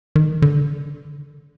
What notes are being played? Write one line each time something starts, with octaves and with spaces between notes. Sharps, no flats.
D#3
D3